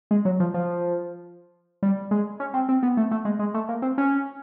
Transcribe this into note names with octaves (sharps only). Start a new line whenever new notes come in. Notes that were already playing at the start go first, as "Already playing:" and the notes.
G#3
F#3
F3
F3
G3
G#3
C#4
C4
C4
B3
A3
A3
G#3
G#3
A3
A#3
C4
C#4